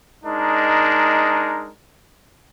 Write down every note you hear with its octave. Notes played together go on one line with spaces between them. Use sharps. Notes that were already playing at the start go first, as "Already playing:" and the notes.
G#3 D4 D#4 A#4